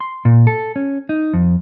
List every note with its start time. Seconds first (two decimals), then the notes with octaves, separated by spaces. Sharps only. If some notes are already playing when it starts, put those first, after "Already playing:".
0.01 C6
0.25 A#2
0.47 A4
0.76 C#4
1.09 D#4
1.34 F2